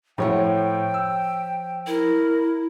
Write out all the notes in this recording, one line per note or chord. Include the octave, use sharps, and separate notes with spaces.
A2 F3 C#5 F#5 G5
E6
E4 A#4